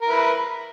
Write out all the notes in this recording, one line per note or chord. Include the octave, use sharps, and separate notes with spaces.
E4 A#4 B4